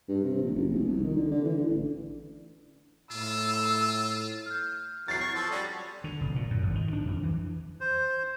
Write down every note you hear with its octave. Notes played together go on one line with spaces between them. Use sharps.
G2
C3
A#1
F#1
F1
C2
D#3
D3
D3
E3
D3
A1
A2 F4 E6
F6 G6
E3 F#3 A6 C7
C#5
F3 A4
G3 C#4 F#4 D5
D3
F1
A#2
F#2
G#1
D#3
D4
F2
E3
C5